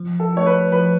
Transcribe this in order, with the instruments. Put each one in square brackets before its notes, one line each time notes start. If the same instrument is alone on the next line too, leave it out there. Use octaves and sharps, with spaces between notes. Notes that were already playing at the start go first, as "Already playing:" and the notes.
Already playing: [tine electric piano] F3
[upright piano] A4
[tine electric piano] A3 D4 F4 [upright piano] C#5
[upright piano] B4
[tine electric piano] F3 [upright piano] B4